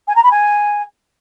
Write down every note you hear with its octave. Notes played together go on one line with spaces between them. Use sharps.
G#5
A#5
B5
G#5